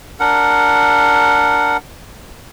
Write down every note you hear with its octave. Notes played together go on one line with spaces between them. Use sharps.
D4 A#4 F#5